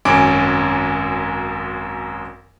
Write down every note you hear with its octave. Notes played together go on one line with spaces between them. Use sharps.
G#1 F#2 C#4 G#5 D6 D7